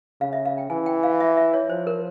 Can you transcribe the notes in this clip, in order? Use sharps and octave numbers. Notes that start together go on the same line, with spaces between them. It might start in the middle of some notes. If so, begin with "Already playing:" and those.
C#3 F5
E5
F5
G5
E3 G#5
G5
F5
E5
E5
C#5
F3 C5
A#4